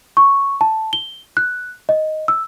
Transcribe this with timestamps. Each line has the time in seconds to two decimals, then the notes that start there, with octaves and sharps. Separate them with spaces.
0.17 C#6
0.61 A5
0.93 G7
1.37 F#6
1.89 D#5
2.28 E6